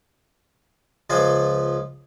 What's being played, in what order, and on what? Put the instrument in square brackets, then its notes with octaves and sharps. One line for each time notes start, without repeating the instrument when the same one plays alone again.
[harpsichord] C#2 F3 F4 B4 G#5